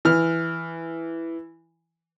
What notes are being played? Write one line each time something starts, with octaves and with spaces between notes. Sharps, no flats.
E3 F6